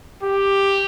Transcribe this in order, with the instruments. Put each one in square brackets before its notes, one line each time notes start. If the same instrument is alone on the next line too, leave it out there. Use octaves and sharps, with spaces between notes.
[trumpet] G4